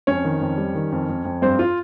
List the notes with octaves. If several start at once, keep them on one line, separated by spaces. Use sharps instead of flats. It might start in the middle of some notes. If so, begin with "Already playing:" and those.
F2 C#4 C#5
D#3
F2
G3
D#3
F2
F2
F2
G2 C4 C5
F4